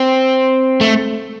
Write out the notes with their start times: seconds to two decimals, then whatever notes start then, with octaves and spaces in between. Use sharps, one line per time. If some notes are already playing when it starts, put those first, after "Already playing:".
Already playing: C4
0.81 A3